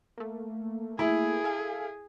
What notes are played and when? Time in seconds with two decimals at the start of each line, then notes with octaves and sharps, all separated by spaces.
0.18 A3 A#3
0.99 E4 G#4
1.44 A4 F5 G#5